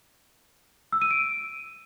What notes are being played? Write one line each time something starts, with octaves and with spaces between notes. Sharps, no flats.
E6
D#7
D7